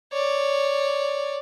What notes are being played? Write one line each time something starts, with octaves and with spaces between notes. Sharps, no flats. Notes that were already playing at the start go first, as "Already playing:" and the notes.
C#5 D5